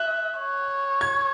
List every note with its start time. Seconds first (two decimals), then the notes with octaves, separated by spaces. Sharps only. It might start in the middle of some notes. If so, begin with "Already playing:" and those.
Already playing: E5 F#6
0.40 C#5
1.01 G#6